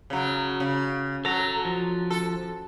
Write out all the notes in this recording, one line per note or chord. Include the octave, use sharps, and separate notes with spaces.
C#3 F#3
C#3
F#3 A4 A#5
F3
A4